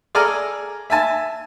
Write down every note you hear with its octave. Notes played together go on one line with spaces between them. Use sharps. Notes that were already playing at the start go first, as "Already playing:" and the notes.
G#4 A4 D5 G#5 A#5 F6
E5 G#5 A5